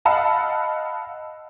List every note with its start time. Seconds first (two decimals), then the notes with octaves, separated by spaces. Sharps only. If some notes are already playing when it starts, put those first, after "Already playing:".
0.05 D#5 F5 F#5 A5 B5 E6